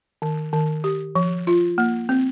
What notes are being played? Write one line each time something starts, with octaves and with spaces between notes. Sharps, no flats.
D#3
D#3
G4
F3
F4
A#3
C4